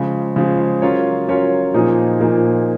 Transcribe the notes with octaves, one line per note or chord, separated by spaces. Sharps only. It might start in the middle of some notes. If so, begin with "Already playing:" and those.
Already playing: C#3 F3 G#3
C#3 F3 G#3
F#3 C#4 F4 A#4 C#5
F#3 C#4 F4 A#4 C#5
A#2 F3 A#3 D#4 G#4
A#2 F3 A#3 D#4 G#4